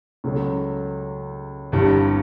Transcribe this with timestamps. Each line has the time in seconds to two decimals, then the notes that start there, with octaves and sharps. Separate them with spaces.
0.24 C#2 C#3 F#3 A3
1.72 G1 C2 G2 C3 E3